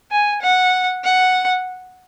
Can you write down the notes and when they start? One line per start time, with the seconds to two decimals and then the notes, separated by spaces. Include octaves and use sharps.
0.11 G#5
0.42 F#5
1.04 F#5